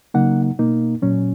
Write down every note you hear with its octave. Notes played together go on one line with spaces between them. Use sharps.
C#3 F#3 A#3 D#4 F#5
B2 A#3 D#4
A#2 F#3 C#4